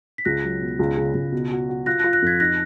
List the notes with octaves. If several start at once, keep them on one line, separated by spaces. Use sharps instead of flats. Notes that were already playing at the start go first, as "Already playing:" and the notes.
B6
C#2 F#6 A#6
F#3
B2
C#2
C#3
C#2
B2
F#4
F#4
F4 F#6 A#6
F4 F#6 A#6
F#6 A#6
F2 G#6 B6
D#4 F#6 A#6